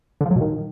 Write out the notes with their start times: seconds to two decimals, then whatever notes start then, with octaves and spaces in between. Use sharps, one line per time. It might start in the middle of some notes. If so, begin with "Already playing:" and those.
0.21 D3
0.26 F3
0.31 F#3
0.36 B2
0.41 D#3